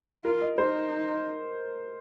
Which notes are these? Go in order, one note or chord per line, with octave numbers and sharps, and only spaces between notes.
F4 A#4
D#5
D#4 C5